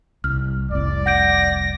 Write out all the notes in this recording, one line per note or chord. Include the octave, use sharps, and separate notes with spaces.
C2 F6
F1 C2 D5
F#5 G6 A#6 D7